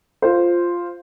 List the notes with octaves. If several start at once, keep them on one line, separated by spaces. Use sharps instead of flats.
F4 C5